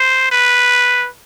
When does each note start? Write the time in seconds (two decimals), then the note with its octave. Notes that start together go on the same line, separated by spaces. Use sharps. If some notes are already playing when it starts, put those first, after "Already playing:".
Already playing: C5
0.32 B4